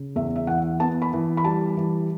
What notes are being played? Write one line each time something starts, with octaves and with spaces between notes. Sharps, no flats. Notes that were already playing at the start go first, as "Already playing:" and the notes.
Already playing: C#3
E2 E5
E5
E3 F#5
B3 A5
B5
E3
B5
G3 A5
E3